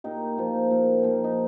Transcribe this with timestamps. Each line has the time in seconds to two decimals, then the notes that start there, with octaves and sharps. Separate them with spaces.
0.04 A#2 D#4 G4
0.38 F3 A#3
0.71 A#2
1.03 F3 A#3
1.24 D#4